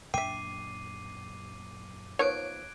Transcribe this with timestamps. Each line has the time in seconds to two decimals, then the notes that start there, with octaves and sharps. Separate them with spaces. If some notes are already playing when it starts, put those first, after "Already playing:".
0.14 F#2 A#2 D4 E5 G5 D6 C7 D#7
2.19 D#3 F3 B3 C#5 F#6 G#6 D7